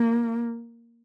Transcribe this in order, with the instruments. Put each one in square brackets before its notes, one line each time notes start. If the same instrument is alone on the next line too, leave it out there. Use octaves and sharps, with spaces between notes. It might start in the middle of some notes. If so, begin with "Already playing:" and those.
Already playing: [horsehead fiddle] A#3